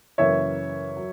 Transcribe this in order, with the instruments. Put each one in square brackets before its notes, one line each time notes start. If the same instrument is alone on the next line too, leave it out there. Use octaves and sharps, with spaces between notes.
[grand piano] F#2 C#3 E3 A#3 [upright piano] C#5 E5
[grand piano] F#3